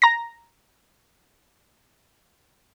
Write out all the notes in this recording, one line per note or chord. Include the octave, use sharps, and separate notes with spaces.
A#5 A#6